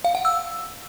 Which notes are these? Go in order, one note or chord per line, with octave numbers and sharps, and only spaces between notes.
F5
F#5
E6